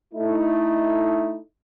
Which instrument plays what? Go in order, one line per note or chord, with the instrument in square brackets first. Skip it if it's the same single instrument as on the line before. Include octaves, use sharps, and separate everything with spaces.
[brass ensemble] A3 D#4 E4